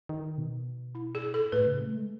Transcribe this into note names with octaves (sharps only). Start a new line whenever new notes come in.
D#3
B2
E4
G#4
A4
A2 B4
C#3
A3
G#3